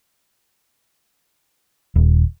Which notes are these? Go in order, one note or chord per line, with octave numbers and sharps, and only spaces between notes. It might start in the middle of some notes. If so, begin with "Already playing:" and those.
D#1